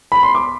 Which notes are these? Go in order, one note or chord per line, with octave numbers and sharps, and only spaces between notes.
B5
C6
D6